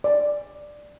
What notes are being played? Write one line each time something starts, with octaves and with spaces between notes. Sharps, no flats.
D5